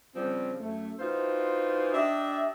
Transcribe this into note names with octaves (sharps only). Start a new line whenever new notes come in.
C#3 F3 G3 C4
F#2 A3
E3 D#4 F4 F#4 C5
D4 G4 D#5 E5